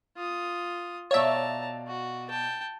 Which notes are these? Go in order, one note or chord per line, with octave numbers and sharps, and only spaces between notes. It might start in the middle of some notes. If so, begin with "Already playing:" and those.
F4 D#6
B2 C#5 D5 E5 F5 A5 A#5
F#4
G5 A5